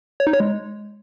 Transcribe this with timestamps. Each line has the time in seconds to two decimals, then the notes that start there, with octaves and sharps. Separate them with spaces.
0.20 C#5
0.27 D#4
0.33 C#5
0.40 G#3